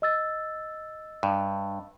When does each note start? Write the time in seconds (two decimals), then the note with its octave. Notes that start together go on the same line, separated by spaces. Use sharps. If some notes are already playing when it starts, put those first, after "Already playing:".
0.02 D#5 E6 A6
1.23 G2